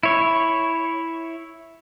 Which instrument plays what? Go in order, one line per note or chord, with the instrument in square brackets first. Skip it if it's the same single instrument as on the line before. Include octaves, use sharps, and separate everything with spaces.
[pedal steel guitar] E4 C#5